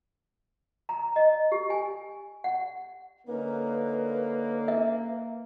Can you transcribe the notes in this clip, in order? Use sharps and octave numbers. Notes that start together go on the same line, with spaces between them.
A#5
D#5
G4
G#5
F#5
D3 A#3 C#4 D#4 B4
E5